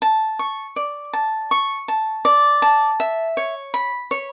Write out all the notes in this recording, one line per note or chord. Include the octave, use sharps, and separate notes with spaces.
A5
C#6
D5
A5
C#6
A5
D5
A5
E5
C#5
B5
C#5